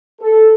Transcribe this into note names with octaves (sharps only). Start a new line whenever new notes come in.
A4